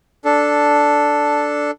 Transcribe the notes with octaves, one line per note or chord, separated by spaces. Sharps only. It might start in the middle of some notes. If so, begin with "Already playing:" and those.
D4 A4